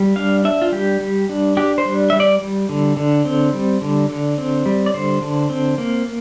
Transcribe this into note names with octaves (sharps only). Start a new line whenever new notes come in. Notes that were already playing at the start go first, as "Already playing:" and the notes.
Already playing: G3
D4 F5
D4 E5
F4
G3 G4
G3
D4
D4 G4
C5
G3
G3 E5
D5
G3
D3
D3
C4
G3
D3
D3
C4
G3
D5
D3 C5
D3
C4
A#3